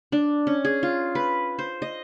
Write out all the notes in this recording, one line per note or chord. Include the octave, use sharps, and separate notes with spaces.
D4
C#4
G#4
F4
B4
C5
D#5